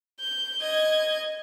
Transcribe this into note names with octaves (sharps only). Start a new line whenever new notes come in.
G6
D#5 G#6